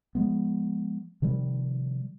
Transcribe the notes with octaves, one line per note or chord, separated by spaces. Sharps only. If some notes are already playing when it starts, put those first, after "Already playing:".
F3 G#3 B3
C3 D#3 F3 G3